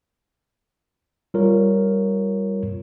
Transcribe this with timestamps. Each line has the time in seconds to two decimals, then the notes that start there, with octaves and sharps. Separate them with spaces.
1.34 G3 F4 A#4 C#5